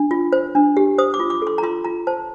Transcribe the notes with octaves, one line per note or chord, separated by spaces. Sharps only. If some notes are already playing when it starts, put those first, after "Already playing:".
Already playing: D4
F4
C5
D4
G4
C5 D#6
D6
F4
D6
A4 C6
A#5
F4 C6
F4 A#5
C5 A5